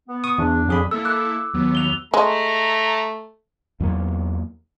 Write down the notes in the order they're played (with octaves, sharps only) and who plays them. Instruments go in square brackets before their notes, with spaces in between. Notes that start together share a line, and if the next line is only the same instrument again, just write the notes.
[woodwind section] B3
[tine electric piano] C#6 D#6
[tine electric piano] E2 [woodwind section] D4
[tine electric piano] F2 G#4 B5
[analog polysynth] A#3 E4 A4 [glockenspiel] E6
[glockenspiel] D6 E6 F#6
[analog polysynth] D#2 F#3 B3
[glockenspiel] F7 G7
[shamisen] G#3 [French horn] A3 [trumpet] A#5
[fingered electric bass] E2 F#3 A#3